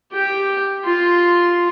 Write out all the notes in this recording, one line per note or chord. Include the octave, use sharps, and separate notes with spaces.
G4 G5
F4 C6